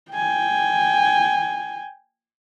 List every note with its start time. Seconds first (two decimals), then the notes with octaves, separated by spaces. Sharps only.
0.12 G5 G#5